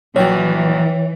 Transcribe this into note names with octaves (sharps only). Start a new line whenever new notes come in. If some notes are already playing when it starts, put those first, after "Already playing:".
A#1 E3 F#3 C#5 G5